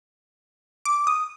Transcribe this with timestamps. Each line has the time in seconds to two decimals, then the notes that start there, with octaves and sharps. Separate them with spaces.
0.85 D6
1.07 D#6